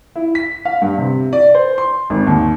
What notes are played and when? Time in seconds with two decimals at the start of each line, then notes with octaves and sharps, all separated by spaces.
0.16 E4
0.35 B6
0.65 F5
0.82 G2
0.98 C3
1.33 D5
1.54 C5
1.78 C6
2.10 G#1
2.27 D#2